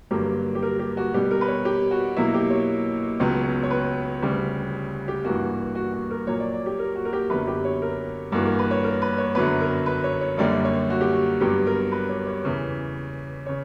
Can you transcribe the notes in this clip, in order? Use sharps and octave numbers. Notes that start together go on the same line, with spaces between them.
G2 D3 F#3 A#3 G4
G4
A#4
G4
F#4
B2 G3 B3 G4
A#4
B4
C#5
G4
F#4
B2 F#3 A#3 E4
G4
C#5
C#2 C#3 F#3 B3
C#5
B4
D2 C#3 G3
G4
G2 E3 A#3 F#4
F#4
F#4
A#4
A#2 F#3 A#3 C#5
D5
D5
G4
A#4
F#4
A#4
G4
F#2 D3 F#3 B3 B4
G4
C#5
A#4
G2 E3 A#3 F#4
A#4
B4
C#5
A#4
B4
C#5
F#2 D3 F#3 B3 B4
A#4
B4
C#5
C#5
F#2 D3 G3 A#3 D5
C#5
F#4
G4
F#4
G2 F#3 B3 G4
A#4
B4
C#5
C#5
E2 C#3 E3
C#3 C#5